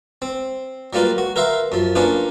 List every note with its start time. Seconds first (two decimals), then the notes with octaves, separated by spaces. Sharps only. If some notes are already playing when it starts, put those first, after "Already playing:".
0.22 C4
0.93 F#3 G3 A#3 F4 B4
1.18 F#4
1.36 A#4 B4 E5 F5 C6
1.72 F#2 F3
1.95 A#3 C#4 D4 F4 B4